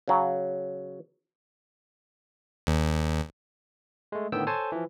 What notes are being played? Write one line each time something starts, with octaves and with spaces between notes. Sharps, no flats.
C#3 F#3
D#2
G#3 A3
A2 D3 D#3 B3 G5 E6
A4 C5 C#5 G#5 A5
E3 F3